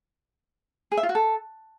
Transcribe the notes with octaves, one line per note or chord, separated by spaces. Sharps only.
G#4
E5
F4
F#4
A4